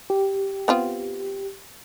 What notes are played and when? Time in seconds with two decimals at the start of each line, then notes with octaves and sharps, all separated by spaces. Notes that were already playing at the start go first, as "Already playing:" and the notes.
0.10 G4
0.68 B3 C4 F4